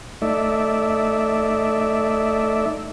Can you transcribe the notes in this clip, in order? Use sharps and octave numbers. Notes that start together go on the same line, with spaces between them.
A3 D#4 D5 E5